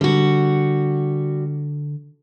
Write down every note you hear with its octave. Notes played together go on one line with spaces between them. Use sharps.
D3 G3 F#4